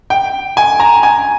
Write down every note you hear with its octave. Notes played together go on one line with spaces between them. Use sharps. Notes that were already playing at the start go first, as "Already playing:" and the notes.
G5
G#5
A#5
G#5